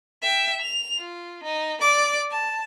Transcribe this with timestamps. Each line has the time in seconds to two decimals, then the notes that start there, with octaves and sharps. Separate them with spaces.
0.22 E5 G5
0.62 F7
0.98 F4
1.44 D#4
1.81 D5 D6
2.31 A5